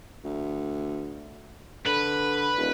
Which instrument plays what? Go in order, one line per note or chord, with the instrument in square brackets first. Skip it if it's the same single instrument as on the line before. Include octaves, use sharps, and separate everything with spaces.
[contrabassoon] D2
[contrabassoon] D3 [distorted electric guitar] B4
[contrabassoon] D#1